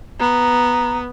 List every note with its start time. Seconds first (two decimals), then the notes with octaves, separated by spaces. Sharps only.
0.20 B3 A#5